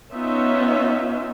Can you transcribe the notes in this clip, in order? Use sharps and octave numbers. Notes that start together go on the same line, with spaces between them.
B3 C#4 D#4 F4 E5